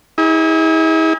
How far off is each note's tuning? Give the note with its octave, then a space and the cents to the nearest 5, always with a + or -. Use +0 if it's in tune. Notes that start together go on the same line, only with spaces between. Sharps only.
E4 -45 G#4 -30